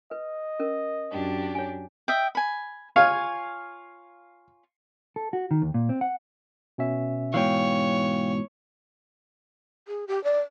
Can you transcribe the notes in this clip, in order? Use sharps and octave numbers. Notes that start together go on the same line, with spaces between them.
B4 D#5
C#4 A#4
F#2 D4 G4
C#5 G#5
D#5 E5 G5
G#5 B5
F4 C#5 F5 G#5
A4
F#4
D#3
D#2
A#2
C4
F#5
B2 C#4 E5
G#2 B2 E3 C#5 F5 G5
G#4
G4
D5